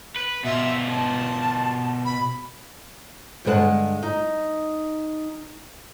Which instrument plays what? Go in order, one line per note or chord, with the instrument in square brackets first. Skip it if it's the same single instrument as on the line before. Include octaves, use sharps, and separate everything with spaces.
[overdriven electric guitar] B4
[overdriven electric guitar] B2 F4 [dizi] E5
[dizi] A5
B5
[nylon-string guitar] G2 D3 G#3 B4 F#5 A5
D#4